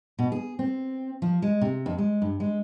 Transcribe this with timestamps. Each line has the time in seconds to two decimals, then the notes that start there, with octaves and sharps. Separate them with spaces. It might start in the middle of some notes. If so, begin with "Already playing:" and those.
0.19 B2
0.32 G#4
0.59 C4
1.22 F3
1.42 G#3
1.61 C3
1.86 F2
1.98 G#3
2.22 G2
2.40 G#3